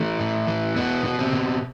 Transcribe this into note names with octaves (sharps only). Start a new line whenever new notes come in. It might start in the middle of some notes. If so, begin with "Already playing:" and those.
Already playing: E3 A3
A2
E3
B2 B3
B2
C4
B2